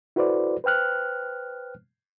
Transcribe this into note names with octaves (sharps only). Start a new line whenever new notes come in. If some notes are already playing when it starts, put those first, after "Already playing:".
E4 F#4 A4 B4 C5 D5
B4 C5 G5 F6 F#6